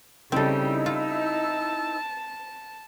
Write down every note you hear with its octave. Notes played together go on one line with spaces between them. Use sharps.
C#3 G3 C4 D#4 E4 A4 E6
F4 A5